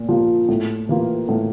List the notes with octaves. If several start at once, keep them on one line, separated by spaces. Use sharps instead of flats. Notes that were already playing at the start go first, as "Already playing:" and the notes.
Already playing: A#2
F3 A#3
A2
E3 A#3 F4
A2